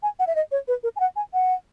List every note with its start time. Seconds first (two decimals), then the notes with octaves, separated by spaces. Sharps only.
0.03 G#5
0.19 F#5
0.27 E5
0.36 D#5
0.52 C#5
0.68 B4
0.83 A#4
0.96 G#5
1.00 F#5
1.16 G#5
1.34 F#5